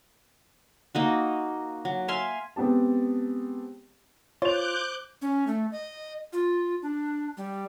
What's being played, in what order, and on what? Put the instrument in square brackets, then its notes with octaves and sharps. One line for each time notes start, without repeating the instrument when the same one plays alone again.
[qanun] A#3 D#4 F#4
F#3
E5 F5 G#5 C6
[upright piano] G#3 B3 C4 G4 A5
[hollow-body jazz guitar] F4 [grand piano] C5 F7 [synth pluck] C#5 A6 [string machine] D6 F#6 G6
[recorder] C#4
A3
D#5
F4
D4
G3